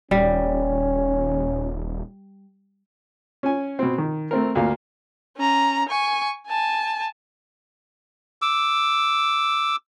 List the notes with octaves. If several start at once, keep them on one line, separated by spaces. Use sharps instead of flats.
D#1 G3 C#4
C#4 G#5
B2 C4
D#3
A3 C4 A#4
D2 A#3 F5
C#4 A#5
G#5 C#6
G#5 A5
D6 E6